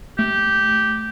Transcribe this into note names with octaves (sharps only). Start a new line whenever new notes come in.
A3 G4